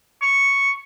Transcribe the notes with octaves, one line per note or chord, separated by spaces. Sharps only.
C#6